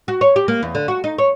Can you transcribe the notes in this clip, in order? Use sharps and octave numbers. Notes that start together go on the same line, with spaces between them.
F#4
C#5
G4
A#3
E2
D3
F#4
D#4
C#5